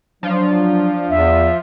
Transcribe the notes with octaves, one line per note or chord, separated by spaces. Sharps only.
F3 F#3 D4 F4
E2 E5